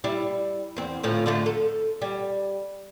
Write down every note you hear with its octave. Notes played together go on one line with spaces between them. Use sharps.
G3 E4
E2 C4
D2 A2 F3
D3 F3 A3
A4
G3